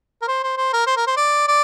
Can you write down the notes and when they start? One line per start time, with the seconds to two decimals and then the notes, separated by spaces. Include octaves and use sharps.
0.22 A#4
0.28 C5
0.43 C5
0.57 C5
0.73 A#4
0.87 C5
0.97 A#4
1.07 C5
1.17 D5
1.48 D5